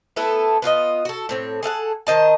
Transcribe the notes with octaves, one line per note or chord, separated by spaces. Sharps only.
A3 B3 E4 A4
B3 F4 G4 D#5
F#4 A4
A2 C4 C#5
G#4 A4 F5 F#5
D#3 C5 D#5 A5